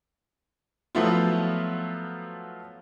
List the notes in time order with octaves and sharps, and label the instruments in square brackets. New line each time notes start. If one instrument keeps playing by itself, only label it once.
[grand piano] F3 F#3 A3 B3 E4 F4